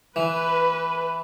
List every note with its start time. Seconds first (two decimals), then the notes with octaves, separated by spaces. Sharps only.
0.16 E3 B4